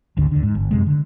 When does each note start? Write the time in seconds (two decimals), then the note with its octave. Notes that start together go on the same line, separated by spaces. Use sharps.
0.17 G#1 D2 D3
0.31 D#2 D3
0.43 G#2
0.55 G1
0.71 F#2 C3 G#3
0.87 D3